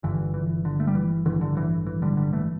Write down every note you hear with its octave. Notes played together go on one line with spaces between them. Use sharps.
G1 G2 D3 E3
E3
D3
A3
G3
E3
A1 G2 D3 E3
D3
E3
E3
D3 G3
D3 G3
E3 A3